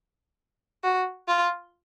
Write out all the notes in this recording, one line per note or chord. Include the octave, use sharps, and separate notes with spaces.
F#4
F4